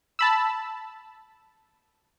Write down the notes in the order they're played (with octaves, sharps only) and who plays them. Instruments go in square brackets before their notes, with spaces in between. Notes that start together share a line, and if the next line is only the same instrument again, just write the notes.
[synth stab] A5 B5 E6